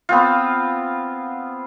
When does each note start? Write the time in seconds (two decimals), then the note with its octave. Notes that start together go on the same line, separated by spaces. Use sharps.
0.09 B3 C4 F4